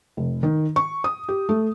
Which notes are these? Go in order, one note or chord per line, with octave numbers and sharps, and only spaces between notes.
F1
D#3
C#6
D#6
G4
A3